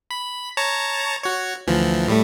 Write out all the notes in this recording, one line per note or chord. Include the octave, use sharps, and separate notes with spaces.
B5
C#5 A5 A#5
F#4 C#5
D2 E3 F3
A2 G3 A3